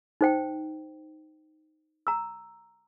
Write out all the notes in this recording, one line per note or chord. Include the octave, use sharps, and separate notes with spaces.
D#4 C5 G5
A#5 E6